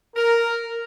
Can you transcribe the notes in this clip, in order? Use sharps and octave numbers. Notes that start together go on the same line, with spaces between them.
A#4